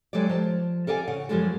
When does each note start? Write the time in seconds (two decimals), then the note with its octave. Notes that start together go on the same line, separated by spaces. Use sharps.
0.13 F#3 G#3 G4 A4 D5
0.29 F3 A5
0.87 A4 A#4 D5 F5 G#5
1.08 C#3 F#5
1.29 F#2 B2 F3 G3 G#3 A4